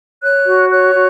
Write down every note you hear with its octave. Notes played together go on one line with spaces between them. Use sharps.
C#5 F#6
F#4
C#5 F#6
F#4